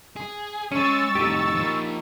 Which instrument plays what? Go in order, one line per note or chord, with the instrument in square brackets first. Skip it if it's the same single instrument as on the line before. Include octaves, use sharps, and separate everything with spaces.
[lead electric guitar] G#4
[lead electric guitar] G#3 G#4 [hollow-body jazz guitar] C#4 [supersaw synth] C#6 E6 A6
[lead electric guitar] F2 A2 [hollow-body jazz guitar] D#4 G4
[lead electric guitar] F3 A#3